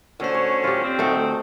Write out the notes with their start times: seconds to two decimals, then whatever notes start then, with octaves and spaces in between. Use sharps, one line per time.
0.20 D2 D3 C#4 C5
0.34 C#5
0.64 F4 G4
0.83 C4
0.99 D2 A3 D#4 A4